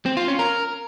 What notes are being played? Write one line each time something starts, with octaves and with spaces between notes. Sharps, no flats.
C4
F4
C#4
A#4